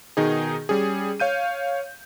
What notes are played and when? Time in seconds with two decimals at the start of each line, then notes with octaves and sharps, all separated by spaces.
0.17 B2 D#3 D#4 G#4
0.69 G3 C#4 G#4
1.20 C#5 F5 G6 D#7